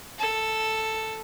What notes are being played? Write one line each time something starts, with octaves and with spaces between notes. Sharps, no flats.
A4